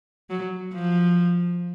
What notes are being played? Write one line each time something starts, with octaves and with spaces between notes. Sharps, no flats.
F#3
F3